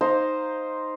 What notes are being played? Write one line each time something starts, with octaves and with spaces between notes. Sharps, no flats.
D#4 C5 F5 A#5